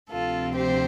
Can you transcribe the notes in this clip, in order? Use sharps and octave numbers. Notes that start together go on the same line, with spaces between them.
D2 C3 F3 C4 F4 A4
G4 C5